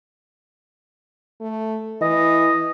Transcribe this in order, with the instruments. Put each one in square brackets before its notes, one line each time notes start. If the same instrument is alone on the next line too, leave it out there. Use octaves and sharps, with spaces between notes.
[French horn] A3
[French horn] E3 [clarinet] D#5